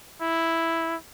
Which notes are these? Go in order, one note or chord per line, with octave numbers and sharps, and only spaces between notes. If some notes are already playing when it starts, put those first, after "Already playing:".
E4